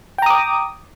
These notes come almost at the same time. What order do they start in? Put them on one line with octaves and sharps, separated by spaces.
G5 A#5 D#6 D6